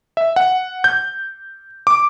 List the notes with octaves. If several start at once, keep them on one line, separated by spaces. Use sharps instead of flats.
E5
F#5
G6
D6